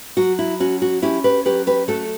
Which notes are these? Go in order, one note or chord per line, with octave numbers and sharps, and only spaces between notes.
F#3 F#4
E4
C#4 F#4
F#4
C#4 E4 G4
G4 B4
F#3 G4 B4
G4 B4
A3 F#4 A4